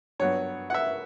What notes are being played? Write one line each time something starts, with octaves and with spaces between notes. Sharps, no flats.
G2 F#3 B3 C#5
F#5
E5